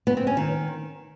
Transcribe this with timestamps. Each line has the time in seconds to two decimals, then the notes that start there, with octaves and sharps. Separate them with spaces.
0.07 B3
0.17 C4
0.27 C#4
0.37 D#3